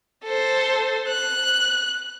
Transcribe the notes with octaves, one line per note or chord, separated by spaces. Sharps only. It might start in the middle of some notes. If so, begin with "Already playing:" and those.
A4 C5
F#6